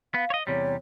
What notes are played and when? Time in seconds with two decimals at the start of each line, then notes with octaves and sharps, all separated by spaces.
0.14 B3 F5
0.30 C#5 D#5
0.47 E2 C3 G3 C#5